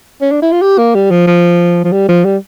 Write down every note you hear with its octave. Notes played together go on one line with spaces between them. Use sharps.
C#4
D4
E4
F4
G4
A#3
G3
F3
F3
F3
G3
F3
G3